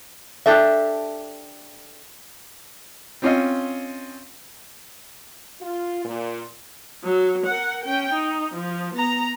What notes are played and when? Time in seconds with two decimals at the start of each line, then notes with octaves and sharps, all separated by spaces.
0.46 D4 G4 A4 E5
3.22 C4 C#4 F4 C#5 D#5 F5
5.61 F4
6.05 A#2
7.04 F#3
7.46 A#4 F#5
7.84 C#4 G5
8.13 D#4
8.55 F3
8.95 B3 A#5